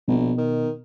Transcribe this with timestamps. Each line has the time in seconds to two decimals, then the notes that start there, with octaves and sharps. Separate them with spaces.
0.08 A#1 B2
0.38 D#3